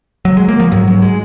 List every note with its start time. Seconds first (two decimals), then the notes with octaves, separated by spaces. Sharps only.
0.25 F#3
0.37 G#3
0.48 A#3
0.60 F3
0.72 G#2 F#3
0.88 F#3
1.02 G#3